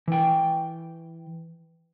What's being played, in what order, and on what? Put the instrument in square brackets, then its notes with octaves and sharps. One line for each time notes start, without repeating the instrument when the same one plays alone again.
[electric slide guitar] E3 G5